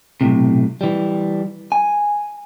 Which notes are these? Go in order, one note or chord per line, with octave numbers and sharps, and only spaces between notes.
B1 F2 A2 C3
E3 G3
G#5